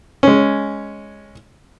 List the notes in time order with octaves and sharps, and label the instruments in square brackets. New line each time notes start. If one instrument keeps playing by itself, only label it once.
[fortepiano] G#3 C#4